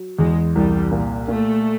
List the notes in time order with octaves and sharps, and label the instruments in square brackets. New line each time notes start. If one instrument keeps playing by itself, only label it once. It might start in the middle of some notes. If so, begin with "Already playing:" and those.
Already playing: [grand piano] F#3
[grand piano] E2 [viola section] G#3
[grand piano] C2 [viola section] G3
[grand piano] A#2
[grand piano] A#2 [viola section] A3